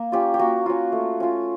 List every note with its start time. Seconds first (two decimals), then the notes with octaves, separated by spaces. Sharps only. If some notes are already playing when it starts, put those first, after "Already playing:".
Already playing: A#3
0.12 C#4 F4 G4
0.34 G4
0.39 A#3 F#4
0.66 C#4 F4
0.92 A3
1.20 C#4 F4